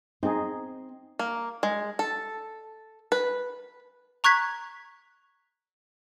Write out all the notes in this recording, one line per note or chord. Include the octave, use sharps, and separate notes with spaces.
C4 D#4 G#4
A#3
G#3
A4
B4
A#5 C#6 F#6 G#6 B6